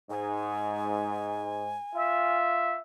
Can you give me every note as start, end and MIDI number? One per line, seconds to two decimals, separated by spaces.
0.10 1.76 44
0.10 2.37 80
1.95 2.78 65
1.95 2.82 76